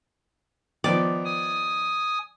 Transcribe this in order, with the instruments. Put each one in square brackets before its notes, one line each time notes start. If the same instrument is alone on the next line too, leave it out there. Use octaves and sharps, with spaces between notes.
[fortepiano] D#3 F3 B3 [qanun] D5
[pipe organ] G#5 D#6